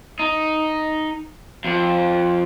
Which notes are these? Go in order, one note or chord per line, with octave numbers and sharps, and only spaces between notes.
D#4
F2